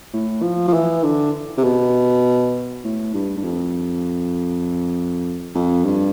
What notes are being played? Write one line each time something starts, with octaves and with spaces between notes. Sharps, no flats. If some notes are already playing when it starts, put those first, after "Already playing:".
A2
F3
F3
E3
D3
C3
B2
A2
G2
G2
F2
F2
G2